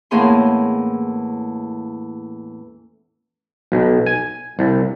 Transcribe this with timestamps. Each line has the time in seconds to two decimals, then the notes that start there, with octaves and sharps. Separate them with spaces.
0.11 E2 A2 A#3 C#4 G#4 C6
3.72 B1
4.06 G#5
4.59 C2